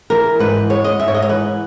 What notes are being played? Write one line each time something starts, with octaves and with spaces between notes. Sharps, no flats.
E3 A#4
G#2 B4
G#3 C#5
D#5
G#2 E5
C#5
D#5
C#5
E3 B4